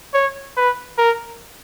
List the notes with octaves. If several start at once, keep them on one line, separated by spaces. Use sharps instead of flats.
C#5
B4
A#4